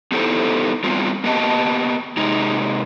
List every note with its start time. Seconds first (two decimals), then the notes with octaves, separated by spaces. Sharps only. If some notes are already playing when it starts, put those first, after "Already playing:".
0.12 B3 D#4 E4 G4 A4 C5
0.84 G3 B3 C4 F4
1.24 A#3 B3 G4 D#5 A5
2.17 C3 G#3 D#4